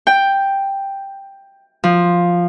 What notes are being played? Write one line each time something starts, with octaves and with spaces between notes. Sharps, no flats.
G5
F3